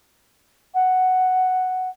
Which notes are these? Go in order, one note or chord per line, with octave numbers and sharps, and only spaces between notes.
F#5